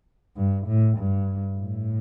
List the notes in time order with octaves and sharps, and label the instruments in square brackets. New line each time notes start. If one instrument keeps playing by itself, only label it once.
[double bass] G2
A2
G2
A2